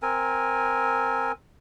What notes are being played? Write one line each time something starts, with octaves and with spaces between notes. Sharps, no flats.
C4 A#4 G#5